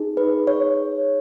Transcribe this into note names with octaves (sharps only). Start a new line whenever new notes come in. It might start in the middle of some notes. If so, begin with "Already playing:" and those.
Already playing: D#4 G#4
B4
C#5